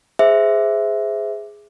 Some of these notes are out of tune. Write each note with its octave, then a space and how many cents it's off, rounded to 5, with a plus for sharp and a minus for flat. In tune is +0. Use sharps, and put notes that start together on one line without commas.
G#4 +0 C5 -20 E5 +0